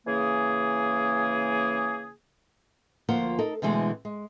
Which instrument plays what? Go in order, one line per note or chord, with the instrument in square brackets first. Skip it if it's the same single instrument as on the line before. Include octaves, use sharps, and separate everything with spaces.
[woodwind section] C#3 E3 A#3 G#4
[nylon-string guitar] D2 F3 A#3 F4 C5 F#5
D#4 A4 A#4
B2 D3 E3 G#3 A3 C4
G#3